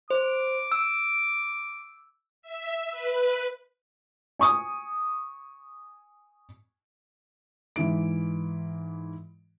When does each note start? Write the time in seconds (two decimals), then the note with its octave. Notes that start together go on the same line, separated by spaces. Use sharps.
0.10 C5 D6
0.72 E6
2.42 E5
2.91 B4
4.39 G#5 C#6 D#6
7.76 G#2 E3 E4 D7